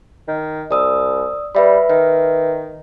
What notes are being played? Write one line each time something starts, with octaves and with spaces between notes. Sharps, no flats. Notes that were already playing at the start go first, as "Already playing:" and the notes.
D#3
C2 D5 D#6 E6
G3 B4 E5 B5
D#3 B4 E5